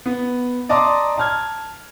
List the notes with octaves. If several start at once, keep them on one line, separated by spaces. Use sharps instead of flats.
B3
D5 D#5 A5 A#5 C6 D6
A5 F6 G#6